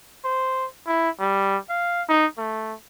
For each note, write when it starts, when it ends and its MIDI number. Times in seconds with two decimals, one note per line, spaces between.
0.25 0.67 72
0.87 1.09 64
1.20 1.58 55
1.70 2.03 77
2.09 2.27 63
2.38 2.74 57